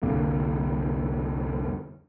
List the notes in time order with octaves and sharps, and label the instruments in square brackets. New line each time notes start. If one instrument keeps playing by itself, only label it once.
[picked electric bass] C2 F2 D3 A#3